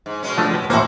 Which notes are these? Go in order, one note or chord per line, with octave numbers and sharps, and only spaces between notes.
G#2
B2 G#3 C#4
F3 A3 D4
B4 G5 A5
A2 E3 A#3 C4 F#4 C5